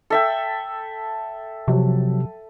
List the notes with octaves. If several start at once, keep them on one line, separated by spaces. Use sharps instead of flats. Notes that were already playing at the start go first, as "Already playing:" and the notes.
A4 E5 G5
C3 F3 F#3